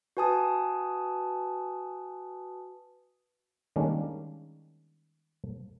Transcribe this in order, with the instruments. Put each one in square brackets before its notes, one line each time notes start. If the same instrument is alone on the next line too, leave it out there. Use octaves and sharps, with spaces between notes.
[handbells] F#4 B4 G#5 A5 D#6
[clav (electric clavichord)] D#3 G3 G#3 A#3 C#4 D4